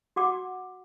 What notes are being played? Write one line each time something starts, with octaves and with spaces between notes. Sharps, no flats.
F#4 F#5 D6